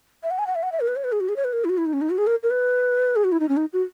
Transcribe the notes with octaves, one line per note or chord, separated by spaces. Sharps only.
E5
F#5
G#5
F#5
E5
F#5
E5
A#4
B4
C#5
B4
G#4
F#4
G#4
C#5
B4
A#4
E4
F#4
E4
D#4
C#4
D#4
F#4
G#4
A#4
A#4
B4
G#4
F#4
E4
D#4
C#4
D#4
F#4